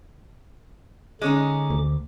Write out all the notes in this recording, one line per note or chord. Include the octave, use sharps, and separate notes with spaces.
D3 G#3 C#4 D#4 D6
D2